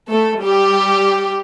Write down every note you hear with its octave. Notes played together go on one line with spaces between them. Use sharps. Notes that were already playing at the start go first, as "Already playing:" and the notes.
A3 A4
G3 G4